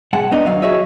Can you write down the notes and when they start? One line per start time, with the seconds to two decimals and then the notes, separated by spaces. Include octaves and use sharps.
0.13 B1 G#3 F#5 A5
0.31 B3 D4 D#4 D#5
0.46 D#2 B2 F#3 F5
0.62 F#4 G#4 C#5 D#5 E5